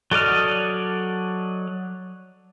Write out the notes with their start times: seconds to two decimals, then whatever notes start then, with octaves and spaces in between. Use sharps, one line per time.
0.11 F#3 A4 D5 D#5 F6